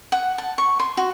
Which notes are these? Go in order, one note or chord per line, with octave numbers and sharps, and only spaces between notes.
F#5
A5
C#6
C6
F#4